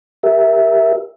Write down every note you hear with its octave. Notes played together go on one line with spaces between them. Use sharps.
G4 A#4 E5